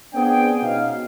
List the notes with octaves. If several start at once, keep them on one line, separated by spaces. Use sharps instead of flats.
B3 C4 D4 G#4 G5
B2 C#4 D#4 F5